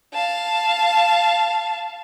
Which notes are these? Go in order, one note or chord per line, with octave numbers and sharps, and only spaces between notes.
F5 A5